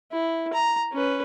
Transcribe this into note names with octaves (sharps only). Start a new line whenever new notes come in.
E4
A#5
C#4 B4